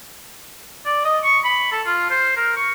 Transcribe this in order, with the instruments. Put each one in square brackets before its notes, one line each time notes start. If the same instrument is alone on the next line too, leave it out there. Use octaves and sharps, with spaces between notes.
[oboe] D5
D#5
C#6
B5
A4
F4
C5
A#4
C#6